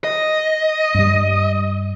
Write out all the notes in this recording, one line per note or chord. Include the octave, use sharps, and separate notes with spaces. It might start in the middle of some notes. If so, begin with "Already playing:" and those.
D#5
G2 G3